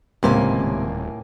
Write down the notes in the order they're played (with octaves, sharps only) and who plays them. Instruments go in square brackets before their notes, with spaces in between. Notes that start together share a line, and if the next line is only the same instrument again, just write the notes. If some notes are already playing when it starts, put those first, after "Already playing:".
[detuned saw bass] D#1 [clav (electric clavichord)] C#2 C3 [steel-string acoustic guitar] A2 A#3 G#5